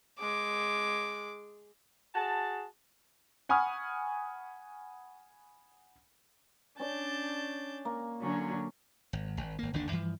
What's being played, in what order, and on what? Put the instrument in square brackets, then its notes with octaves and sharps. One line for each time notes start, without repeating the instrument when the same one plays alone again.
[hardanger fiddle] G#3 D6
[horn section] F#4 G#4 A5
[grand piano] F#5 G#5 B5 C#6 D#6 F6
[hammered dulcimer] C#4 D5 [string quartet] D4 A5 G6
[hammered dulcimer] A#3
[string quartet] D3 F#3 C#4
[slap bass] G#1
G#1
G#1 A#3
G1 D#2 D3 D4
G2 E3 F3